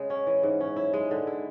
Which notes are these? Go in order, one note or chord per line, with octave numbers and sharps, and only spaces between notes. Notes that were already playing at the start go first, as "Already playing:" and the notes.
Already playing: C#3 G#3
C#4
E3
G#2
C#4
E4
G#3
D3
E4